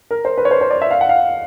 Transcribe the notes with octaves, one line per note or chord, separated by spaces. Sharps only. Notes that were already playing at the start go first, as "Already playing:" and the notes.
A#4
C5
B4
C#5
C5
C5
D5
E5
F5
F#5
F5